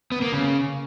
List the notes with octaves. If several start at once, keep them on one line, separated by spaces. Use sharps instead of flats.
B3
A#3
C#3